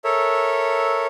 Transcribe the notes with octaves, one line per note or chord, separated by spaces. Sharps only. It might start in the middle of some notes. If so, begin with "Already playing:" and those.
A4 A#4 C#5 E5